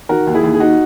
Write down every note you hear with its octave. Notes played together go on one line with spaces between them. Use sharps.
D#3 F#4 A#4
D#2
E4 G#4
D#2
G#4
D#4 F#4